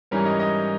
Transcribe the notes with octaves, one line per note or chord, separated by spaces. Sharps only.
G#2 E3 G3 C#4 A#4
D#5
D#5